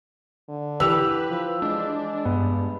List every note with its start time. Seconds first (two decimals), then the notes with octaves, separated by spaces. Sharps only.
0.49 D3
0.80 E3 G4 B4 E6 F7
1.29 F3
1.62 G#3 D4
2.25 G2 B3